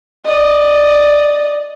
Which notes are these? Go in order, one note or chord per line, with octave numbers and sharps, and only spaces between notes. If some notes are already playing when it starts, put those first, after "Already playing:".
D5 D#5